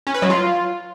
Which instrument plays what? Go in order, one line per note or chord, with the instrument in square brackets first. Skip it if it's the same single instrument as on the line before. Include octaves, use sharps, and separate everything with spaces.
[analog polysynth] C#4
B4
F#3
F4